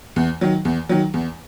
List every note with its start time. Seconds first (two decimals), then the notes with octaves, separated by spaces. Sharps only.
0.16 E2
0.41 D#3 F#3
0.65 E2
0.89 D#3 F#3
1.14 E2